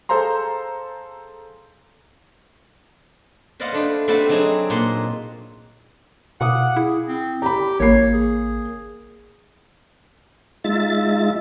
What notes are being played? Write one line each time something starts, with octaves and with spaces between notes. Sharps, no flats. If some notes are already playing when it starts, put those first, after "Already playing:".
G#4 A4 C5 F5 A#5 C6
B4 C5 D5 D#5 F5 F#5
A3 D4 B4
A3 C4 D4 F#4 A4 B4
F#3 C4 D4 D#4 G#4
A#2 F#5 C6
B2 F5 F#5 D6 D#6
E4 G#4
C4
G4 A#5 B5
A1 A#3 C#5 C7
G#4
G#3 D#4 F4 E5 A6